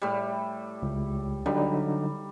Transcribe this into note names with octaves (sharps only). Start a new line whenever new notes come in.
A2 G3
C#2
D3 F#3 G3 D#4